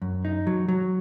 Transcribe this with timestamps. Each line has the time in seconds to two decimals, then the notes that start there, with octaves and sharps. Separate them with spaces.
0.02 F#2
0.25 D#4
0.47 F#3
0.68 F#3